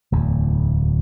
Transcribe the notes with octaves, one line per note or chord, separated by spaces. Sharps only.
D1 E2